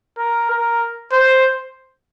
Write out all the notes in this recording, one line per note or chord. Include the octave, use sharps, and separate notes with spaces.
A#4
A#4
C5